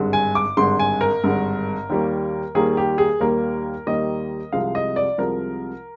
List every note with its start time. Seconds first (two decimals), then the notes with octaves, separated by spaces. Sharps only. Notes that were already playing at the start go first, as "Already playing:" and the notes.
Already playing: G#1 G2 D3 G#3
0.13 G#5
0.35 D6
0.57 G#1 G2 D3 G#3 C6
0.79 G#5
1.01 A#4
1.24 G#1 G2 D3 G#3
1.89 D#2 D#3 G3 A#3
2.55 D#2 D#3 G3 A#3 G#4
2.77 G4
2.98 G#4
3.20 D#2 D#3 G3 A#3 A#4
3.87 D#2 D#3 G3 A#3 D#5
4.53 C2 C3 F3 G#3 F5
4.75 D#5
4.96 D5
5.18 C2 C3 F3 G#3 A#4